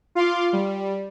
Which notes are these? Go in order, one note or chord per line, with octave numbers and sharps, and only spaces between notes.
F4 F5 C6 D6
G3